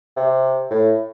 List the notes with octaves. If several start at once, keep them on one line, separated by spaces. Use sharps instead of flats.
C3
A2